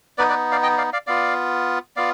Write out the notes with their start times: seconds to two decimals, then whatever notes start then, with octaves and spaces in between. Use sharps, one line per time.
0.18 B3 D#4 B4 D5
0.29 B4 D5
0.52 D5 F5
0.63 D#5 G5
0.78 D5 F5
0.93 D5 F5
1.07 B3 F4 D5 F5
1.96 B3 F4 D5 F5